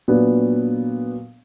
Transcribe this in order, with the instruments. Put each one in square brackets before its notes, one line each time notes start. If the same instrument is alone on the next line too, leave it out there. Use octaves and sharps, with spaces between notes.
[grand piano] A#2 F#3 B3 D4